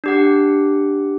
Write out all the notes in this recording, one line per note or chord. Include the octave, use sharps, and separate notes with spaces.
D4 G4 F#5